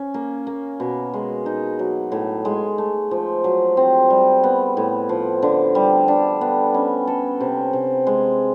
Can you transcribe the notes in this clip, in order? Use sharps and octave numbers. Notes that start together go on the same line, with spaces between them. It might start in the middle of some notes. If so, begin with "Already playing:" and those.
Already playing: C#4
A#3
A#3
B2
G#3
D#4
F#3
A2
G#3
A3
F3
F#3
C4
G3
B3
A2
F3
D3
G3
D4
B3
C#4
A4
C3
C3
G#3